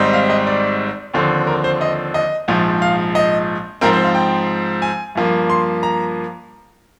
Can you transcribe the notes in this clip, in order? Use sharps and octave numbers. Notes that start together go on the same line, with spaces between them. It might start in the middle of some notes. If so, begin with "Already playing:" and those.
Already playing: G#1 G#2 G3 C4 D#4
F5
D#5
D5
D#2 D3 F3 C4
A#4
C5
D#5
D#5
A#1 G#2 F3
F5
D#5
G#2 F3 C4 A#4
C5
F5
G5
G#5
G2 F3 A#3
C6
A#5